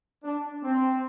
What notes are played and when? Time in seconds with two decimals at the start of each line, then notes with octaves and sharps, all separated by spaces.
0.24 D4
0.63 C4